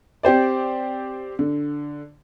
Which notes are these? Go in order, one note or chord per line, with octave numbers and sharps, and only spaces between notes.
C4 G4 C5 D5
D3